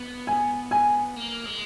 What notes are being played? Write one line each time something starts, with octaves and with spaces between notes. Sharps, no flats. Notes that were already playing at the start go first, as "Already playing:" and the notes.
Already playing: B3
G#5
G#5
A#3
G#3